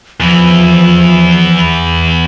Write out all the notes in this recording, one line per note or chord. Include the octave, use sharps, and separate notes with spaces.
E2 E3 F3